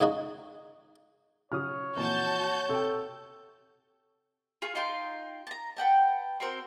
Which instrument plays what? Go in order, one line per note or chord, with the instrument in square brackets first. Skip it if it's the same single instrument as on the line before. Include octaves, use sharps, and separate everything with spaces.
[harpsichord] G#2 C#3 D#4 F#4
[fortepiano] C#3 F#4 D#6 [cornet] C#5 [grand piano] F6
[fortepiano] F2 A#2 E3 [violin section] F#4 A5 G6
[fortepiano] C3 G5 [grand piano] A4
[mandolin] F4 G#4 F5 C#6
D#4 F4 G5 C6
A5 A#5
B4 F#5 G5 A5
C4 F#4 A#4 C5